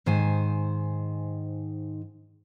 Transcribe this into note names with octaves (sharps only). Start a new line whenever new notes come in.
G#2 D#3 C5 G#5